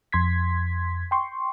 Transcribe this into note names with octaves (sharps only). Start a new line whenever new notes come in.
F2 C6 G#6 B6
G5 C6 C#6